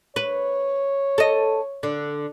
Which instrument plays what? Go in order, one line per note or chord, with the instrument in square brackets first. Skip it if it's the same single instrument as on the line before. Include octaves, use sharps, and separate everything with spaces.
[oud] B4 [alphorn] C#5
[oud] A4 D#5
D3